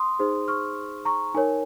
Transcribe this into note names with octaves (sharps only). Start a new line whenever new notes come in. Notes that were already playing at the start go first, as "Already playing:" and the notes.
Already playing: C6 D#6
D#4 G#4 C5
C#6 F6
A#5 C#6
D#4 A#4 C#5 G#5